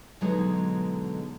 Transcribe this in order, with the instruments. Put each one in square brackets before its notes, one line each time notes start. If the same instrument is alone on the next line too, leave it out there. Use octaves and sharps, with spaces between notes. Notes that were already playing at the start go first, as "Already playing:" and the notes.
[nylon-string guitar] B2 D3 F#3 G#3 D#4 G#4